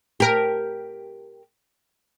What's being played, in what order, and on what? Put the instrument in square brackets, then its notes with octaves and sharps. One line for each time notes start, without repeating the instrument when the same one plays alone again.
[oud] G4 A#4